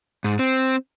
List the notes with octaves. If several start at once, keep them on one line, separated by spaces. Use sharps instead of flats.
G#2
C4